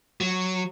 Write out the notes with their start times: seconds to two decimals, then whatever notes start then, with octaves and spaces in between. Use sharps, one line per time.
0.21 F#3